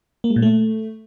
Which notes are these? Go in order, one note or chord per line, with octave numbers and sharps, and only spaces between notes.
A#3
G#3
A#2
A3